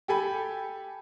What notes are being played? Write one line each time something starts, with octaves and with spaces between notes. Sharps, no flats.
G4 A4 G#5 B5